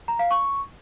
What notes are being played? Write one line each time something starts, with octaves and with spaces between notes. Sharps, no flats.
A#5
F5
C#6